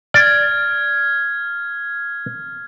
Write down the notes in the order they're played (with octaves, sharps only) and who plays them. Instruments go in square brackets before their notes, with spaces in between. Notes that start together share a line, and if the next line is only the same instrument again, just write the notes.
[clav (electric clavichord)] D5 [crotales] F6 G#6